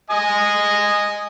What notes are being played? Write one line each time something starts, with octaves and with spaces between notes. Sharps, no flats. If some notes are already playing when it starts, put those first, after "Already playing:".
D#5 G#5 D#6